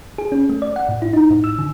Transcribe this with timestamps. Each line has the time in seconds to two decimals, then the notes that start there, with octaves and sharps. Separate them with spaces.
0.18 G#4
0.32 C#4
0.49 A3
0.62 D5
0.76 F#5
0.89 A2
1.02 E4
1.13 D#4
1.30 A2
1.44 E6
1.59 D3